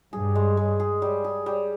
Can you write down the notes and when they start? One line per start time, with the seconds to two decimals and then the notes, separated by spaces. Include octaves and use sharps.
0.13 G2 G#4
0.35 G#3
0.57 G#3
0.80 G#4
1.02 G3
1.24 G#4
1.46 G3